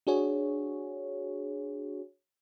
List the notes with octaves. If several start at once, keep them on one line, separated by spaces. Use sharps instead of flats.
D4 F#4 G#4 C#5